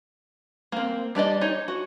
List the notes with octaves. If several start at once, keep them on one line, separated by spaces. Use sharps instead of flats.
A#3 C4
G3 D4 D5 D#5
D#4 C#5
F#4